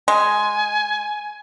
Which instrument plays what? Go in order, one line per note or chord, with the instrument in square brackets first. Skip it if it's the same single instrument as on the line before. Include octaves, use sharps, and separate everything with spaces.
[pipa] G#3 [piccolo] G#5